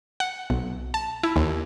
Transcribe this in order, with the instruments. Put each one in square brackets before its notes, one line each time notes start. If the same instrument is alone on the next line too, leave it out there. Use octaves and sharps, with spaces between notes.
[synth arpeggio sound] F#5
B1
A5
E4
D#2